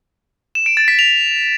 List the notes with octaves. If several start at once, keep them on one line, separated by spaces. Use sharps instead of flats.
E7
D7
A6
B6
F7